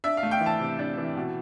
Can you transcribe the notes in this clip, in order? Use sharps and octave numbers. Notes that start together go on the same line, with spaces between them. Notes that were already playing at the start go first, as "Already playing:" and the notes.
D4 E5
F5
A3
G5
E3
A5
C3
D4
E3
B2